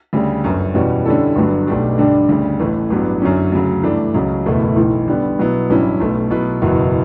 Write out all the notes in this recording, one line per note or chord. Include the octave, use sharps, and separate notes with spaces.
D2 C#3 G3
G1 F#2 D3
E2 B2 G3 C#4 F#4
D3 G3 C#4 E4 A4
G1 G2 D3 F#3
B1 B2 A3 D4 G4
G2 D3 G3 D4
D2 C#3 G3
A1 A2 E3 A3
A1 G2 F#3 B3
F#2 D3 F#3 C#4
D2 C#3 F#3
G2 E3 A3 D4
C#2 C#3 F#3 C#4
F#1 E2 B2 A3 E4
B1 A2 E3
D3 G3 B3
B2 F#3 B3 E4
A1 G2 F#3 C#4 E4
B1 B2 A3
B2 F#3 B3 E4 B4
F#1 E2 B2 F#3 B3